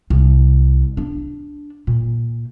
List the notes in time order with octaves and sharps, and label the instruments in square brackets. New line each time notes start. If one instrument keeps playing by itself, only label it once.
[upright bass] C2
D4
A#2